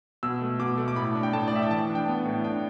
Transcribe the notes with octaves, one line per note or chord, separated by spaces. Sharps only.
B2 E6
A3
B2 D6
A3
D6
A2 B5
D4
G5
A2 A5
D5
A2 E5
G5
E3 A5
D4
G5
B3
A2
D4 G5